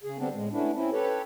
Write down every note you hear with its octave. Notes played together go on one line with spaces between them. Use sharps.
C#3 G#4
D3 G3 B3 C4 D4
A2 G#3
A3 B3 C#4 D4 E4
C4 C#4 E4
G4 A4 B4 C#5